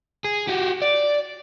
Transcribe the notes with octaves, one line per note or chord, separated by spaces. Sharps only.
G#4
F#4 G4
D5